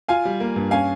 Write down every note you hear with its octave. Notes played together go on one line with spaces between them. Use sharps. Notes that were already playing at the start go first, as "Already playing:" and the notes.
F4 F5 G#5
G3
A#3
G2
C#4 F5 G#5